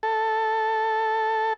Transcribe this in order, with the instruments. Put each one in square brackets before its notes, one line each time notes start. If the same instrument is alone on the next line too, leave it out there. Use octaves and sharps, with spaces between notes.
[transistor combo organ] A4